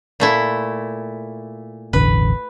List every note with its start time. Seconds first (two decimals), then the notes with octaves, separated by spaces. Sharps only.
0.20 A#2 A3 E4
1.93 E1 A1 D3 B4